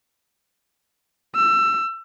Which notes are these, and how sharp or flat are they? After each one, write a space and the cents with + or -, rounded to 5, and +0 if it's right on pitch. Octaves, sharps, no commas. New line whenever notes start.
E6 +25